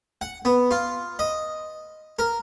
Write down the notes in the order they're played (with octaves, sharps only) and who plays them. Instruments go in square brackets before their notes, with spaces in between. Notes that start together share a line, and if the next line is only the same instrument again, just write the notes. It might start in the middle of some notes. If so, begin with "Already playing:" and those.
[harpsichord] F#5
B3
F4
D#5
A#4